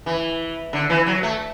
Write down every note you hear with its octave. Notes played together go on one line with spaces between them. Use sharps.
E3
D3
E3
F#3
A3